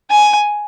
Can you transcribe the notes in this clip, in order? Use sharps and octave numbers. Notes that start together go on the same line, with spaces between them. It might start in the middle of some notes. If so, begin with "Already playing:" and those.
G#5